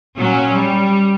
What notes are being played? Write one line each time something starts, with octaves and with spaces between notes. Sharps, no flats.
A#2 F#3 C#4
G3